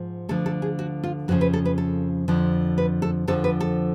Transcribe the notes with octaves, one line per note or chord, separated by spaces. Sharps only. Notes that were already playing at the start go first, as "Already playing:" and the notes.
Already playing: G#2 F3
D2 D3 F3 A4
A4
G#4
F#4
F4
F2 C#3 F3 F#4
B4
A4
B4
A4
F2 D3 F3
B4
A4
F2 D3 F3 A4
B4
A4